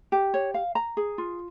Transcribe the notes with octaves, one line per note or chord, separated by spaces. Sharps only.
G4
C#5
F5
A#5
G#4
F4